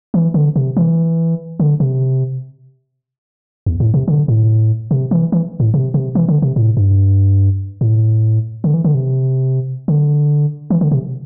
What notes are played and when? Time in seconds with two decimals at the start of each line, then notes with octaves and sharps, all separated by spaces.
0.14 E3
0.34 D3
0.56 C3
0.77 E3
1.60 D3
1.80 C3
3.66 E2
3.80 A2
3.94 C3
4.08 D3
4.28 A2
4.91 C3
5.11 E3
5.32 E3
5.60 A2
5.74 C3
5.94 C3
6.15 E3
6.29 D3
6.42 C3
6.56 A2
6.77 G2
7.81 A2
8.64 D3
8.74 E3
8.84 D3
8.95 C3
9.88 D3
10.70 E3
10.81 D3
10.92 C3